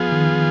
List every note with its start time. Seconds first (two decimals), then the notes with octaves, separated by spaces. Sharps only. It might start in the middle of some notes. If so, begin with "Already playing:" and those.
Already playing: F3 B3 F4 G#4
0.12 D#3